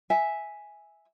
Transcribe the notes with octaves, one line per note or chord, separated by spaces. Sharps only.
E5 G#5